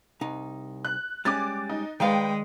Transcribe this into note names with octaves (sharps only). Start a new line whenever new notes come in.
C2 D#4
F#6
G3 G#3 C#4 D6 A6
D#4
D#3 G#3 B4 D5 F5 G5